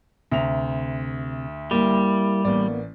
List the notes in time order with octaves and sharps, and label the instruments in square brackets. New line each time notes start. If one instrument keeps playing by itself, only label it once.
[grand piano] D2 F7 [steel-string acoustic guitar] C3 A#5
[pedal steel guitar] G3 [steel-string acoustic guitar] A#3 E4
[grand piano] A1 D5 [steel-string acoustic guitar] A#3 B3